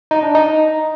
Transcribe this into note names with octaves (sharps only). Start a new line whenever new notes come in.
D#4
D4
D#4